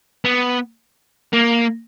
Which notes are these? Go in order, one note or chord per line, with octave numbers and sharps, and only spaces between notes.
B3
A#3